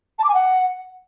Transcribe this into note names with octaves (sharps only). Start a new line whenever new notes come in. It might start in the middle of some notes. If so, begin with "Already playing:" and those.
A5
D6
G#5
F#5